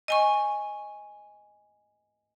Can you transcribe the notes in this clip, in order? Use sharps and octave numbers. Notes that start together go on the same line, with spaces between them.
D#5 G#5 C#6